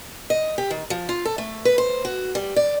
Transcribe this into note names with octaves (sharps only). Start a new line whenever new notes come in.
D#5
G4
D#3
F3
F4
A4
A3
B4
C5
F#4
G3
D5